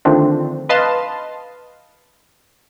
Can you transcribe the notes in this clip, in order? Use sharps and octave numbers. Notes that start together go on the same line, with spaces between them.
D3 D#3 F3 A3 C4 D4
B4 D#5 F5 A5 C6